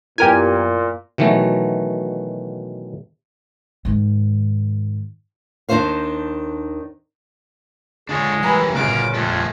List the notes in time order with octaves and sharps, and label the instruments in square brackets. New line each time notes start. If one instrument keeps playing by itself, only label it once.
[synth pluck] F#2 B3 E4 [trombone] A#2 [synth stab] G4 A#4 G#5
[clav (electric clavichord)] B2 D#3 E3 F#3 A3
[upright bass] G#2 D#3
[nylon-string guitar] D#2 D#3 D4 A4 C5 F5
[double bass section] D3 [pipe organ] G#3 [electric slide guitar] D4 F4 C#5
[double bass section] E3 [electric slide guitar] F#3 G3 A#3 [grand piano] G#5 A#5 B5
[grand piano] G1 [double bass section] A#2 C#3 [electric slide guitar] F#4 G#4 F5 [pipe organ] D6
[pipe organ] F2 [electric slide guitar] A3 G#4 A4